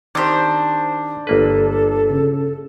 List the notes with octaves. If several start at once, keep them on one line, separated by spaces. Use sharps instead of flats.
D#3 C4 D4 G4 C5
G1 A#3 A4 B4
C#3